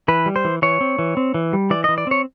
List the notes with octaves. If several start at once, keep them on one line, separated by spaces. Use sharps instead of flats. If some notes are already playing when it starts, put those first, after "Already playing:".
E3 B4
G3
C5
E3
E3 C#5
C4
E3
C4
E3
G3
E3 D5
D#5
E3
D5
C4 C#5